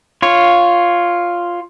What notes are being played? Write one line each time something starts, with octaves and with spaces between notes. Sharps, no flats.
F4 C#5